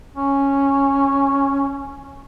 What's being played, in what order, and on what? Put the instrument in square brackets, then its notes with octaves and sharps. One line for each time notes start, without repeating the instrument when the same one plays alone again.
[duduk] C#4